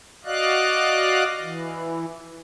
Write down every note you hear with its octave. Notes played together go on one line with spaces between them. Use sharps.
F#4 D5 D#5 F5 F#6
E3